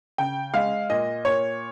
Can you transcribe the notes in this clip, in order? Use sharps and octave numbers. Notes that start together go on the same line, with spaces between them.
C#3 G5
G#3 F5
A#2 D#5
A#2 C#5